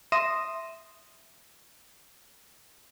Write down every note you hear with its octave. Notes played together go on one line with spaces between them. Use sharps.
E5 C6 D#6 A#6 D#7 E7